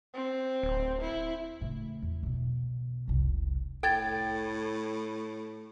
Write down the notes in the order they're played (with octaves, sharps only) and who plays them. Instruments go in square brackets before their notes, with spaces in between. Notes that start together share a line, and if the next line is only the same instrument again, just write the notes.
[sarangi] C4
[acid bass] D1
[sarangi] E4
[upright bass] A2 C#3
E2
B2 D3
F1 C2
[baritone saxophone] A2 [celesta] A4 G#6 A6 [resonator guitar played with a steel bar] G5